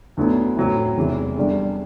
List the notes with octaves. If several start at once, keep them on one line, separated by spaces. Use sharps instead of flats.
D2 D3 F#3 B3 E4
A2 F#3 C4 E4
E1 E2 C3 E3
E2 D3 G3 D4